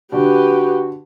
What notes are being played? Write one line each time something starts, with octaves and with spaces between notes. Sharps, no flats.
D3 F#4 G4 B4